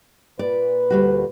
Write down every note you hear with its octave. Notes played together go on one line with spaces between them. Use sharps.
A#2 B4 D5
D2 G3 F#4